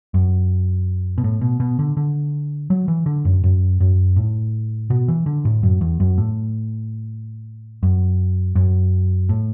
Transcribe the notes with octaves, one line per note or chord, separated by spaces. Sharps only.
F#2
B2
A2
B2
B2
D3
D3
F#3
E3
D3
F#2
F#2
F#2
A2
B2
E3
D3
A2
F#2
E2
F#2
A2
F#2
F#2
A2